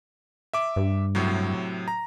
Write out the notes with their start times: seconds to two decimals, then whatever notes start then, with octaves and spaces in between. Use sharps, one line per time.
0.53 E5 D6
0.76 G2
1.15 A2 C3 F#3
1.88 A#5